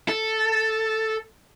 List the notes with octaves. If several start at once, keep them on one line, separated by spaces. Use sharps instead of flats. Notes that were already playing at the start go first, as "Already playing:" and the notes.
A4